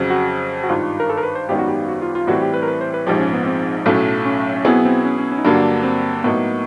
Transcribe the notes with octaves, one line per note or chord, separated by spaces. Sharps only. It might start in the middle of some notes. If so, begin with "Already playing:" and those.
Already playing: F2 C#3 F#3
F#4
F#4
G#1 G2 D#3 F4
A#4
A4
A#4
B4
C5
G#1 F#2 D#3 G3 B3 G4
F#4
G4
F#4
F4
F4
A2 E3 G3 C4 F#4
G4
B4
A#4
B4
C5
B4
A#1 G#2 F3 G4
C#4
B3
C4
B1 A2 F#3 A3 C#4
C#4
C#4
B2 F#3 B3 C4 E4 G#4
C4
C#4
C#4
C#4
D#4
G2 D3 F#3 A#3 D4
C4
A2 F#3 A#3 B3 D#4